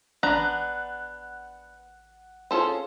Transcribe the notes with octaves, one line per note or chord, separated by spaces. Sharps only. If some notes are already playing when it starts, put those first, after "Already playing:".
A1 B3 D4 F#5 A#5 F#6 F7
C4 C#4 F4 G#4 A4 C5